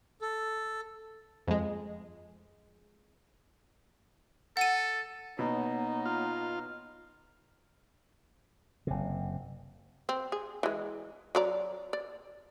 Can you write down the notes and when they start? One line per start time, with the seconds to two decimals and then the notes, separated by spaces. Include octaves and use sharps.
0.22 A4
1.47 F2 G#3
4.57 A4 F#5 D#7
5.39 B2 A#3 D#4 C#5 F#5
6.06 F4
8.87 F#1 C3
10.09 C4
10.32 G#4
10.63 E3 G#3
11.35 F#3 D5 A#5
11.93 D5